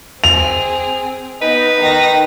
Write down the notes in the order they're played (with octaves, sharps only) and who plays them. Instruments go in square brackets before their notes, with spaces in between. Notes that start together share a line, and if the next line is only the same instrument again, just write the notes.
[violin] C4 G#4 [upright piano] F7
[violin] B3 [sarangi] D#4 [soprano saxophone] B4
[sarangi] D#3 [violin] D#4 A#6